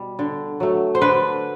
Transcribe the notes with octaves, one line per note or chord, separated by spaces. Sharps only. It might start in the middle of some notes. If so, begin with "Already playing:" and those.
Already playing: B2 G3
D3
F#3 A3
C5
D3 B4